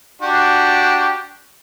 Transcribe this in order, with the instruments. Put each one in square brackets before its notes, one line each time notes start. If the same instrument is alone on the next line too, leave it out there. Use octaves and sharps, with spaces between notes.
[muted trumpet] D4 [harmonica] F#4 G4